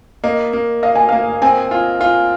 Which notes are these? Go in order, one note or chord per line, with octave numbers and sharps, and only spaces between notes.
A#3 D#5
A#3
D#5 F5
G#5
A#3 F5
C4 G#5
F4
F4